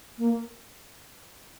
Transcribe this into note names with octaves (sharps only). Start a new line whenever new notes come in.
A#3